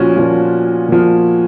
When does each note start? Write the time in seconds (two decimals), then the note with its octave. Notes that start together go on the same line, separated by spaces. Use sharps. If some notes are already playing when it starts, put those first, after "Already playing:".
Already playing: A#2 F3 C#4 F#4
0.16 A#2 F3
0.89 A#2 F3